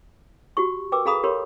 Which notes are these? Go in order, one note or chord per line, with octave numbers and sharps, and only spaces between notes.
F#4 G4 C#6
A#4 B4 G5 D6 E6
G#4 A4 F5 A#5 B5 D#6
G4 A#4 C#5 B5